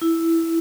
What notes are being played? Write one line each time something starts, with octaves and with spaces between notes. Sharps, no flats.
E4